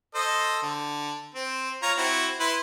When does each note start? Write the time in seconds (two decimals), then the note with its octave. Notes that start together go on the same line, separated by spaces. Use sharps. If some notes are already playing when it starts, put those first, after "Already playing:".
0.15 A4 C5 D#5
0.63 D3
1.35 C4 C5
1.83 F4 C#5 A#5
1.98 C4 E4 F#4
2.40 E4 B4 C6